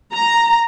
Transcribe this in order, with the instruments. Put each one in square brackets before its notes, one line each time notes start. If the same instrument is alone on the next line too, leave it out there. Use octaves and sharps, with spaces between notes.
[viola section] A#5